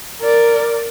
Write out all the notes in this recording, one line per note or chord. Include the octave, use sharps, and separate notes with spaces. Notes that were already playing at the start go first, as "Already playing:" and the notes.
A#4 D5